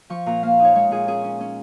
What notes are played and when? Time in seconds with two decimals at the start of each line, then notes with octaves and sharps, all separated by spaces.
0.10 F3 C#6
0.26 A#2 A#5
0.43 A#3 F5
0.60 D#4 C#5
0.75 G#3 C#5
0.91 A#2 G#4
1.08 C#4 G#4
1.24 C#4
1.41 C#4